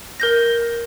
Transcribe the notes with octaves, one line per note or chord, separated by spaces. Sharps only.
A#4 G6 A#6